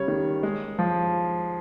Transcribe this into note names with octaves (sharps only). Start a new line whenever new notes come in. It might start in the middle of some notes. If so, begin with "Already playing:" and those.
Already playing: C#3 G3 C#5
D#3
G#3
F3